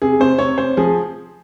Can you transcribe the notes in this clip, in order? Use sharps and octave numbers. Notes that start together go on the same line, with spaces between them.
C3 G#4
C3 C5
C3 C#5
C3 C5
F3 G#4